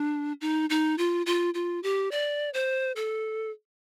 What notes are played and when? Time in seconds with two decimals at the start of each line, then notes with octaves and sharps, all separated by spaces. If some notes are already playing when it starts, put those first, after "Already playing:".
Already playing: D4
0.41 D#4
0.70 D#4
0.98 F4
1.26 F4
1.54 F4
1.83 G4
2.11 D5
2.54 C5
2.96 A4